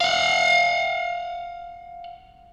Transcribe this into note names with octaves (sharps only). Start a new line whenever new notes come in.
F5 F#5